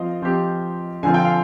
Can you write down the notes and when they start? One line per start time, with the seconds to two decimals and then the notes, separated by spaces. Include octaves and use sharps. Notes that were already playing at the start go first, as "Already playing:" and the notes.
Already playing: F3 C4 D#5 F5
0.22 F3 C4 G4
1.03 D3 F3 C4 F4 G#5
1.14 G5
1.25 F5